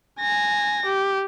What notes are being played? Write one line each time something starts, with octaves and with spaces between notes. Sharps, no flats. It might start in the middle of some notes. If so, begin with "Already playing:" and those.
G#5 A#6
G4